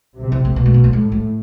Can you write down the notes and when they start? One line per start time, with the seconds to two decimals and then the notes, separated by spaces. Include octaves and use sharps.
0.20 C3
0.32 E3
0.45 A3
0.56 B2 A#3
0.66 A3
0.74 A#3
0.84 A3
0.93 A2 G#3
1.12 A3